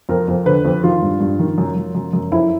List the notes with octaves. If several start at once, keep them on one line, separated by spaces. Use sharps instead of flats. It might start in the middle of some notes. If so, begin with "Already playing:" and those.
F2 A#4
F2
D3 B4
F2
D#3 F4
G2
G2
D#3
F#2
F#2
F#2
F#2
F2 E4